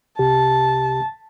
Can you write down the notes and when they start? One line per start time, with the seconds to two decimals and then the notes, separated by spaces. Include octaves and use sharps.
0.19 C2 C3 G4 A5